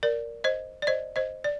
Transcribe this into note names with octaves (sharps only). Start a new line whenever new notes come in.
A#4 D5
C5 D#5
D5
C5 D#5
C5 D#5
D5